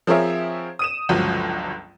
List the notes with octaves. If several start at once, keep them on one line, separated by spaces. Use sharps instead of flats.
F3 C4 G#4 A#4 C#5 E5
D#6 D#7 E7
G1 C#2 F3 F#3